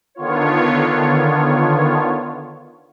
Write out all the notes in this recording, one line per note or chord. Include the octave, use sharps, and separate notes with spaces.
D3 D#3 B3 F4 C#5